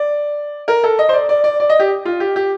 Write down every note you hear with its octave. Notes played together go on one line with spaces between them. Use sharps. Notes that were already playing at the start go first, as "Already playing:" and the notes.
Already playing: D5
A#4
A4
D#5
C5
D5
D5
D5
D5
D#5
G4
F4
G4
G4